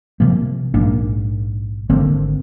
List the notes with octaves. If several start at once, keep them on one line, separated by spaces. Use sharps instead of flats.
C3 F3 A#3
A#1 G#2 A#3 D4
G#1 D3 A#3 C4